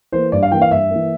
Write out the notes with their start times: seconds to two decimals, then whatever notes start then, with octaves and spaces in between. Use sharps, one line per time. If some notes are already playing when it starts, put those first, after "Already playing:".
0.12 E3 A#3 C5
0.32 G2 D5
0.43 F5
0.51 E3 A#3 G5
0.62 F5
0.71 G2 E5
0.90 E3 A#3